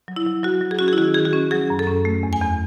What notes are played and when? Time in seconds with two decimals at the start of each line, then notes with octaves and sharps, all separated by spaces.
0.08 F#3
0.16 E4
0.26 F#3
0.43 F#3 F#4
0.61 F#3
0.71 G#4
0.79 C#4 F#4
0.88 E4 G#4
0.98 D#3 F#4
1.14 D#3 G#4
1.25 F#4
1.33 C#4
1.51 F#3 G#4
1.70 F#2
1.79 A4
1.87 C#4
2.05 A3
2.23 E2
2.33 G#5
2.42 E2